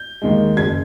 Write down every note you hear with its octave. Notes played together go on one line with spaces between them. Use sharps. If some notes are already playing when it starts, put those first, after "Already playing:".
Already playing: G6
D#2 D#3 G#3
F#1 G#6